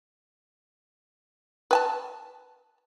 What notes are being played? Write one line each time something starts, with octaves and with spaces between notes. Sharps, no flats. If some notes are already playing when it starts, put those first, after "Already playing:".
B4 G#5 A5